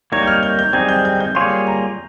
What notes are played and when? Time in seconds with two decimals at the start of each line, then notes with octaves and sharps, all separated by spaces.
0.12 G3 A#3 D#4 A#4 C#5 G#6
0.23 G6
0.27 F6
0.43 G6
0.59 G6
0.73 G3 C4 D#4 G#4 G#6
0.89 G6
1.05 G6
1.20 G6
1.35 G3 A#3 F4 G#4 C#5 C6
1.67 A#5